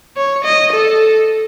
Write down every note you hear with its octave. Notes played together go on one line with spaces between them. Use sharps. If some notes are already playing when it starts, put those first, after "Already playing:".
C#5
D#5
A4